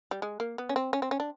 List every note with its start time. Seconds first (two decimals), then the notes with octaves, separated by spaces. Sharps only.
0.11 G3
0.22 G#3
0.40 A#3
0.58 B3
0.69 C#4
0.76 C4
0.93 C#4
1.02 C4
1.11 C#4
1.20 D4